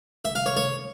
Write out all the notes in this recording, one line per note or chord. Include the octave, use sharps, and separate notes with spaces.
E5
F5
C#5
C#5